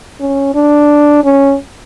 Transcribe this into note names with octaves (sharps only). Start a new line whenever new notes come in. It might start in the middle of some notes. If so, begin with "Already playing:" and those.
C#4
D4
C#4